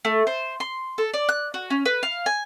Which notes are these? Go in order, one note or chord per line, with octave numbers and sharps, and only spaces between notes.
A3
C5
C6
A4
D5
F#6
F#4
C#4
B4
F5
G#5